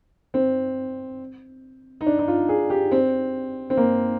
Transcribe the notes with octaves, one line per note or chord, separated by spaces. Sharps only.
C4
D#4
D4
D#4
F4
G#4
G4
C4
C4
A#3